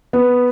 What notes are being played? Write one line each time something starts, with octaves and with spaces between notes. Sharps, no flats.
B3